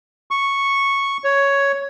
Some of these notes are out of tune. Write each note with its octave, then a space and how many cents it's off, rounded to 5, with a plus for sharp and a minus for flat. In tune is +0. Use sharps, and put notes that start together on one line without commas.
C#6 -5
C#5 +5